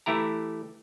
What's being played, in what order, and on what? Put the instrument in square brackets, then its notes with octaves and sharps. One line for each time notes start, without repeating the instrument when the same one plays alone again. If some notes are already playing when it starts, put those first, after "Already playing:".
[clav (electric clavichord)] E3 A3 E4 G4 A#5